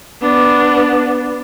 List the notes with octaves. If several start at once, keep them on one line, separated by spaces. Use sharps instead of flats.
B3 D4